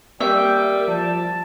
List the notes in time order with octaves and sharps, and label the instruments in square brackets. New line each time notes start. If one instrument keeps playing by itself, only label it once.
[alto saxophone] G3 [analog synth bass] A#3 [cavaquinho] E5 [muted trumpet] G5
[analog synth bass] F3 [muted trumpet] A5